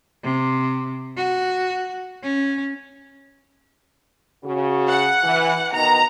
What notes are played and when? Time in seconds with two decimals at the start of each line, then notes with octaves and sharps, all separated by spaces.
0.24 C3
1.17 F#4
2.23 C#4
4.44 C#3 F#4
4.87 F#5
5.24 E3
5.73 B2 D#3 A#5